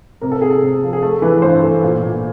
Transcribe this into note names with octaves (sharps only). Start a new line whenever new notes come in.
C3 A#4
A4
C3 G#4
A4
C3
F3
G#4
A3 A4
E3 B4
G2 C5
A3
A#2
A#2